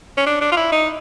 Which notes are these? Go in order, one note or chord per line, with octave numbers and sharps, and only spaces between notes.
C#4
D4
D4
F4
E4
D#4